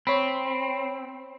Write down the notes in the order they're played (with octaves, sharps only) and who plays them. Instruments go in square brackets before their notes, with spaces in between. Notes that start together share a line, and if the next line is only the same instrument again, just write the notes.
[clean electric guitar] C4 [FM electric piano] C#5 B5